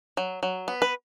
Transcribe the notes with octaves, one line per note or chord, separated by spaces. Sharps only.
F#3
F#3
B3
B4